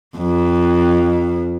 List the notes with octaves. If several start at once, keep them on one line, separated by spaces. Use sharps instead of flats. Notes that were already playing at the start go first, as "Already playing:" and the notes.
F2